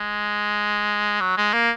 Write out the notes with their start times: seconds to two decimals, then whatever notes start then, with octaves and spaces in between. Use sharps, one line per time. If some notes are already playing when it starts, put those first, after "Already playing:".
Already playing: G#3
1.21 F#3
1.37 G#3
1.53 A#3